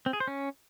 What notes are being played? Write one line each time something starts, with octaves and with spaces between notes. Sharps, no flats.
C4
G#4
C5
C#4